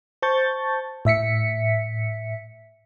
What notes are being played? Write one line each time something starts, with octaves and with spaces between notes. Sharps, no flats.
C5 A5 C#6 G6 A6
A2 E5 B6 C#7